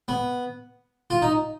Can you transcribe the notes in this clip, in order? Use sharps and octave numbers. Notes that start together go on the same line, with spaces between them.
B3
F4
D#4